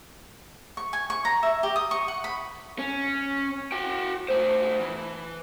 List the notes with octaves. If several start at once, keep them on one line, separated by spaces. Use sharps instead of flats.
C#6
G#5
C#6
A#5
E5
G4
D#6
C#6
F#5
B5
C#4
F#4 G5
A3 C5
E3